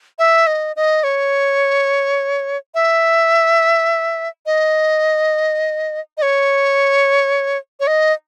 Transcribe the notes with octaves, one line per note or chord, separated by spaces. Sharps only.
E5
D#5
D#5
C#5
E5
D#5
D#5
C#5
C#5
D#5